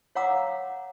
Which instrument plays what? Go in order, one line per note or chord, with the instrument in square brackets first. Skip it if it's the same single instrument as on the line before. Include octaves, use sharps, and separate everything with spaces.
[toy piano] C#5 F5 F#5 A#5 D6 E6